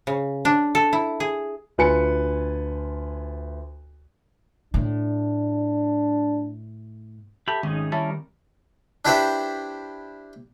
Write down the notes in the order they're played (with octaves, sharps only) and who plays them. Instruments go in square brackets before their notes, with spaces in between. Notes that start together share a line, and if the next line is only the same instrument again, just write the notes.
[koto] C#3
D4
A4
E4
G#4
[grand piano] D2 F4 B4 G#5 C#7
[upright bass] A2 [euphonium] D4
[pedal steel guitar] G4 B5 [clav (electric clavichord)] A4 [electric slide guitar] E5
[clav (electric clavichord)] G#1 [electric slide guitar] D#3 A3 C4 [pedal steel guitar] C#4 D#4 G#4
[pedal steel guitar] G3 A#4 [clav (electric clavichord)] C#4 E4 A5
[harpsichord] D4 E4 G4 B4 C5 E5